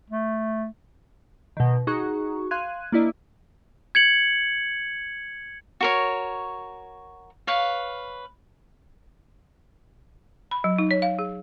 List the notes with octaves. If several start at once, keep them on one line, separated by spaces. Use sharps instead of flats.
A3
B2 D#3
D#4 F#4 G#4 A#5 C#6
F5 C6 F#6 G#6 D#7
A#3 D4 E4 D5 D#5
G#6 C#7 F#7
F#4 A#4 C#5
B4 C#5 F5
B5
F#3
D#4
C#5
F5
G#4